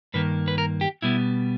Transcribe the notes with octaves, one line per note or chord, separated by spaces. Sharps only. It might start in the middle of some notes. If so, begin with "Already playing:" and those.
G2 D#3 A#3 B4
B4
A#4
G4
B2 G3 B3 E4